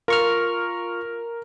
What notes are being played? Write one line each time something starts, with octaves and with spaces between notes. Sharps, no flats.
F4 A#4 C#6 F6